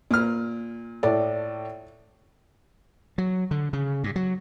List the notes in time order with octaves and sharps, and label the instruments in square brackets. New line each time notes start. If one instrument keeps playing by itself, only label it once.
[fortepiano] A#2 F6
[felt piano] A2 A4 D5
[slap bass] F#3
D3
C#3
G2
F#3